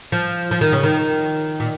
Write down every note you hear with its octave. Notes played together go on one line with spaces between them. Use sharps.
F3
F3
D#3
C#3
D#3
A#2